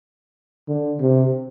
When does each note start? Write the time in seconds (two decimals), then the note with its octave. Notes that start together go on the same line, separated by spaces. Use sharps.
0.68 D3
1.00 C3